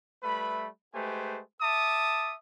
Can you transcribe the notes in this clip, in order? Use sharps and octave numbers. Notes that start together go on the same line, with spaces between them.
G3 A3 B4 E5 B5
G#3 A3 G4 B4 C5 G#5
E5 A5 D6 D#6